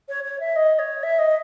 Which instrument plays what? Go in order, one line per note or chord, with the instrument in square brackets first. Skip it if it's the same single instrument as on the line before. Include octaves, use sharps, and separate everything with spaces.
[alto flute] C#5
C#5
E5
D#5
C#5
E5
D#5